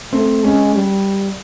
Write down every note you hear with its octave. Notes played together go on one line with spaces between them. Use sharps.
A3 C4
G#3 C#4
G3